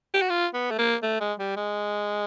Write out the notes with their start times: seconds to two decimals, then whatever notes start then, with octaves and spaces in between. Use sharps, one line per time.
0.14 G4
0.22 F#4
0.30 F4
0.54 B3
0.71 A3
0.78 A#3
1.03 A3
1.20 G#3
1.39 G3
1.57 G#3